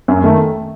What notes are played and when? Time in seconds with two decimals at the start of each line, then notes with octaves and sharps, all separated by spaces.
0.08 F#2
0.24 D#3 A3